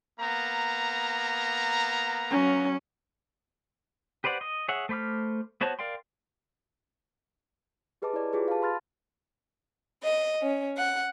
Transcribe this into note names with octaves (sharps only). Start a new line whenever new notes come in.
A#3 B3 A#5
F#3 C#4
G4 B4 C5 D5 F#5
D#5
G#4 C#5 E5 F#5
A3 C5 B5 D6 F6
B3 F#4 C5 C#5 A5
A#4 D5 F5 G5 C6
G4 G#4 B4 D#5 A5 D6
E4 C#5 D5 D6
F4 G4 G#4 B4
F5 A5
B5 C6 F6 A6
D#5
C#4
F#5